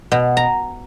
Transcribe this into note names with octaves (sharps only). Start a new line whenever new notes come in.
B2
A#5